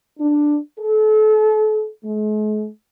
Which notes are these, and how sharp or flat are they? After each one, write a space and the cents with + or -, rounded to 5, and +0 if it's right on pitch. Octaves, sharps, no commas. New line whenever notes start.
D4 +5
A4 -35
G#3 +45